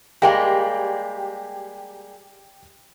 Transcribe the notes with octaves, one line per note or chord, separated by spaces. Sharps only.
G3 G#3 A#3 G4 G5